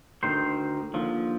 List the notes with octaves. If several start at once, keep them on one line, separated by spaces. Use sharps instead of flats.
D2 C3 D#3 C5
D#2 D3 F3